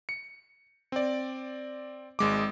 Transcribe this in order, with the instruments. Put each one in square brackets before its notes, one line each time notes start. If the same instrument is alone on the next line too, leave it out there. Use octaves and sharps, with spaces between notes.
[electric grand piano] C#7
C4 D5
G#1 G#3 D6